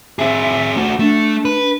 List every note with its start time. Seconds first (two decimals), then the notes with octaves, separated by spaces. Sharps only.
0.19 C4 G#4 E5
0.76 A3 F#4
0.99 A3 D4
1.45 B4